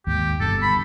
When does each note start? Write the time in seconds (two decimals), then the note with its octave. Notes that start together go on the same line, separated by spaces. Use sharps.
0.07 D#2 G#2 G4
0.40 G1 G2 B2 A4
0.62 B5